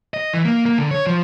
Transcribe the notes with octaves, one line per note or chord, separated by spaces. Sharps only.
D#5
E3
A#3
A#3
D3
C#5
F3